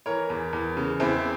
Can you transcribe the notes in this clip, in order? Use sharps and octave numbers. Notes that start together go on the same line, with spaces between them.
E3 A#4 C#5
E2
E2
C#3
E2 C4 E4